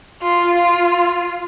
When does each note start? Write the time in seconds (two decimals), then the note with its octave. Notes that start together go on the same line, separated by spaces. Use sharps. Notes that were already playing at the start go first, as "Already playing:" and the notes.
0.22 F4
0.55 F4